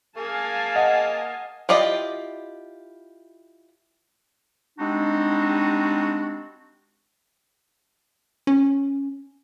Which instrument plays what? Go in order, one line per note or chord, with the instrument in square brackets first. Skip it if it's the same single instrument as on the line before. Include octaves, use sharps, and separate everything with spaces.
[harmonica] A#3 G#4 [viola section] F5 G#5 A5
[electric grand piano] D#5 [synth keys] F#5
[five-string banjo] E4 F4 G4 D5 D#5
[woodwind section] G3 G#3 C4 D4 D#4 F#4
[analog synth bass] C#4